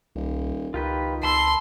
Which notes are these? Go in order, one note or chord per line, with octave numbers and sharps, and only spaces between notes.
D#1 C2
C#2 D#3 F4 G4 B4
C#2 A5 B5 C6 E6